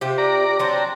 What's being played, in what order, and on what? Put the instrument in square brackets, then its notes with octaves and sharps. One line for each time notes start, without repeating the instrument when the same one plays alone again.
[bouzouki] C3 F4 G4
[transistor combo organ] D5 A#5
[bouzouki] F#3 C4 D4 [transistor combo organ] A#5